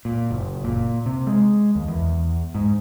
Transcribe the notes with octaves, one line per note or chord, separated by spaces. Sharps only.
A#2
F#1
A#2
C3
G#3
D#2
E2
G#2